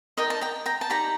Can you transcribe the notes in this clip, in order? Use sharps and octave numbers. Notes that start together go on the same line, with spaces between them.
D#4 A#4 D5 D#5 G5
A5
G5 A#5
G5 A#5
A5
D#4 G4 D5 G5 A#5